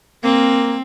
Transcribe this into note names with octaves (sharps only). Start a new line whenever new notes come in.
A#3 C4